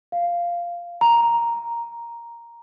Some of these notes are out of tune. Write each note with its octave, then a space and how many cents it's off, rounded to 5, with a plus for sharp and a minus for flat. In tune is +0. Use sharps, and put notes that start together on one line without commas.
F5 -10
A#5 +5